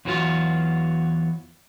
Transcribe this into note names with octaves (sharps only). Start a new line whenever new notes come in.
E2 E3 F#3 G#3 F4 F#4